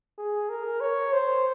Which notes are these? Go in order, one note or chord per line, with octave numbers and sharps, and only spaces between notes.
G#4
A#4
C#5
C5